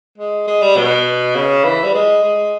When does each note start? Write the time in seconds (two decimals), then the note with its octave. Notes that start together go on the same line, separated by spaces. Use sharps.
0.18 G#3
0.47 G#3
0.62 G3
0.77 B2
1.35 C#3
1.64 E3
1.84 G3
1.94 G#3
2.23 G#3